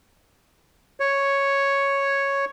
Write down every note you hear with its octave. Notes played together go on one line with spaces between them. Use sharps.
C#5